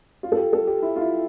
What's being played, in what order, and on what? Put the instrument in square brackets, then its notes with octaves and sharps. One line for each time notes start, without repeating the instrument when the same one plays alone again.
[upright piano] F4
A4
G4
A4
G4
E4
F4
E4